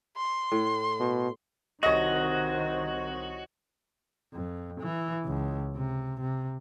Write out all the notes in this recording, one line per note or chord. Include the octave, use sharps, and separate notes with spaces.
C6
A2
B2
C2 D#3 C4 F#4 C#5 D#5 A#6
F2
E3
C#2
C3
C3